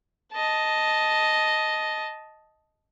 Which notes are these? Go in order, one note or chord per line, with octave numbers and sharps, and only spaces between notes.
D#5 A5